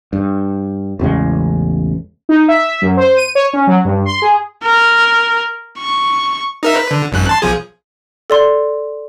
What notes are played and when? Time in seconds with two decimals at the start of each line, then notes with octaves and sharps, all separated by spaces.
0.13 G2
0.99 A1 E2 C#3 G#3
2.29 D#4
2.48 E5
2.82 F#2
2.97 C5
3.16 D#7
3.35 C#5
3.53 C#4
3.67 F#3
3.85 G2
4.06 C6
4.22 G#4
4.63 A#4
5.78 C#6
6.63 D#4 A#4 E5
6.76 B4
6.91 D3
7.12 G#1 F#2 F#6
7.29 A5 C6
7.42 B1 F3 G#4
8.30 A4 D5 C6